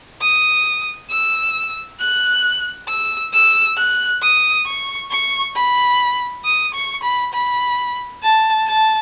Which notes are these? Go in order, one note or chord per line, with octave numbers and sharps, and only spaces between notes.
D#6
E6
F#6
E6
E6
F#6
D#6
C#6
C#6
B5
D#6
C#6
B5
B5
A5
A5